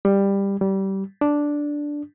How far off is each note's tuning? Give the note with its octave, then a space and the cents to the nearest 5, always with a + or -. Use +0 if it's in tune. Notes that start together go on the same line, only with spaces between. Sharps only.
G3 +15
G3 -20
D4 -5